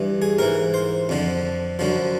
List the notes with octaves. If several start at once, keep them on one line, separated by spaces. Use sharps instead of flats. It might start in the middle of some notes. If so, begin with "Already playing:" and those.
Already playing: G2 E3
G#4
G#2 E3 A#4
C5
F2 D3 F3
F#2 D3 F3